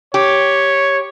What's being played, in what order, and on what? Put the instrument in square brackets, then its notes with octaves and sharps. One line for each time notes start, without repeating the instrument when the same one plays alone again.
[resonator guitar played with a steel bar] G4 [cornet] C#5